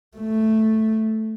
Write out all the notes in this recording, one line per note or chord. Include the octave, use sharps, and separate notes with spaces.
A3